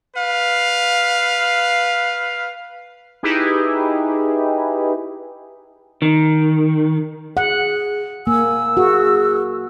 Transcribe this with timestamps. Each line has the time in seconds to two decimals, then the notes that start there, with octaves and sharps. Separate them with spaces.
0.15 B4 F5
3.23 D#4 E4 G4 G#4 B4
6.02 D#3
7.37 G#4 F#5
8.27 A#3 G#5 E6
8.77 F#4 G#4